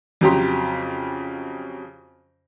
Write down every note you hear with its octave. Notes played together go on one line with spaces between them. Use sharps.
F2 C#3 F#3 G4 A#5 C6